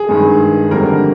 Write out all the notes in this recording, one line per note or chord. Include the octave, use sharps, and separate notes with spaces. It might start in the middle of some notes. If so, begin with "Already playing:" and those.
Already playing: G#4
G2 D#3 G#3
F2 D3 G3 A#3 A#4